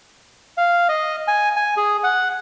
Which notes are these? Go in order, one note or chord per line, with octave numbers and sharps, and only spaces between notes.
F5
D#5
G#5
G#5
G#4
F#5